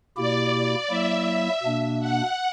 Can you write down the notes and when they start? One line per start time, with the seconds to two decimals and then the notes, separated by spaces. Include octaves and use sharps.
0.16 B2 A#3 E4 G4 D5
0.89 F#3 A#3 E4 E5
1.63 B2 A#3 D4
2.00 F#5